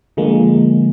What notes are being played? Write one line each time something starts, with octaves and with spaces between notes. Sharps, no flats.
D3 F3 G#3 A#3